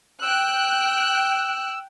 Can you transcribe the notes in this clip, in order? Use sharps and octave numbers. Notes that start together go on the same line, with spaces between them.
G5 E6 F#6